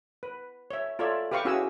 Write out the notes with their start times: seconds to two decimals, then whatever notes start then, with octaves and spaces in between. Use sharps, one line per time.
0.23 B4
0.71 C#5 E5
0.99 F4 A4 C#5 D5 E5
1.31 G4 B4 F5 G5 C#6 D6
1.45 C#4 E4 F#4 G#4 G#5 E6